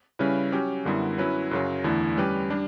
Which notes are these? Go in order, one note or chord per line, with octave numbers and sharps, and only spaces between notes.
C#3 G3 C#4 E4 B4
F#3 C#4 G4
F#2 D3 G3 B3 E4
F#3 C#4 E4 B4
F#2 C#3 F#3
E2 D3 A3 E4
G3 C#4 G4 B4
G3 D4